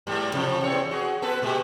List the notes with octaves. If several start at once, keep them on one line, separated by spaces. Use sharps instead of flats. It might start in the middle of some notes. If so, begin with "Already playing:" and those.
E2 G#2 G3
A2 C3 F3
E2 C4 C#5
F#4 G#4
B3 A4 B4
A#2 G#3 G4